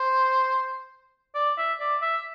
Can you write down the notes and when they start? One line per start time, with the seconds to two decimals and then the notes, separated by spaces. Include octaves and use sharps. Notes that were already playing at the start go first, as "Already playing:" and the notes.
Already playing: C5
1.34 D5
1.58 E5
1.80 D5
2.02 E5